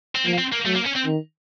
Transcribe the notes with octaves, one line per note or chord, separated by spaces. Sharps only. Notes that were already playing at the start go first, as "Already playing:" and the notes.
C4
F3 A#3
C4
A#3
F#3 A3
A#3
C#4
C4
D#3